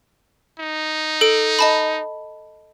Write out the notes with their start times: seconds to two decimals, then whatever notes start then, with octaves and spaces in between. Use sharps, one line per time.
0.60 D#4
1.21 A4 D7
1.59 D#5 A5 B5